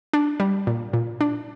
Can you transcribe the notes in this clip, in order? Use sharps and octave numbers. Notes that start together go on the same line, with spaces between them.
D4
G3
A#2
A#2
D4